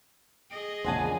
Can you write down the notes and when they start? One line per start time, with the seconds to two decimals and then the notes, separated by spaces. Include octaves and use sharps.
0.50 G#4 D#5
0.84 E1 A#1 C#3 C5 F#5 G#5 A5